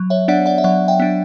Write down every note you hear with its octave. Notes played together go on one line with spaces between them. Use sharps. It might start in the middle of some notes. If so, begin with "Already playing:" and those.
Already playing: F#3
C#5 E5
B3 D4 D5 F#5
D5 F#5
E5
F#3 D5 F#5
E5 G5
B3 D4